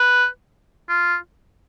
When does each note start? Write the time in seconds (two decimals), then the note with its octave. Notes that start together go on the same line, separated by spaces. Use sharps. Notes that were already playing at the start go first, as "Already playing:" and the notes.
Already playing: B4
0.89 F4